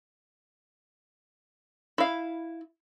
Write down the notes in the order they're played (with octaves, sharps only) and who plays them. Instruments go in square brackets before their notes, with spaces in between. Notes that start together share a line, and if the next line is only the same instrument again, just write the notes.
[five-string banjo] E4 F5